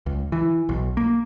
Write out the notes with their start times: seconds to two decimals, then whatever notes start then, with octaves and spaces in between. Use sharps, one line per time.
0.06 C#2
0.32 E3
0.69 B1
0.97 A#3